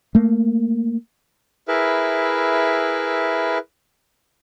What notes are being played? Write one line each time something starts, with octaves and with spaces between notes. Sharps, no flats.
A3 A#3
E4 G#4 A#4 B4 E5